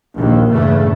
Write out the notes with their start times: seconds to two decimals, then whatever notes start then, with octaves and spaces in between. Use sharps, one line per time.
0.16 A#1 D#2
0.51 E2 G2 A#2 C#3 A3